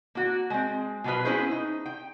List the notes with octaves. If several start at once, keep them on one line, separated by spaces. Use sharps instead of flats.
A#3 F#4
G#3 C4
B2 F#3 B3 D#4 F4 B4
B3 C#4 E4 G#4 B4 C5
D#4
G5